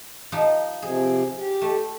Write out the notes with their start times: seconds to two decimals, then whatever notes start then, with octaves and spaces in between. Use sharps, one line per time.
0.32 F3 D#4 G4
0.82 C3 F3 G#4
1.39 G4
1.62 A3